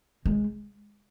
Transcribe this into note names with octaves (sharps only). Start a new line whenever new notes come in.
G#3